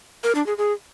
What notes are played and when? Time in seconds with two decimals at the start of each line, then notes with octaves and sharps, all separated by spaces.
0.24 A#4
0.35 D4
0.46 G#4
0.58 G#4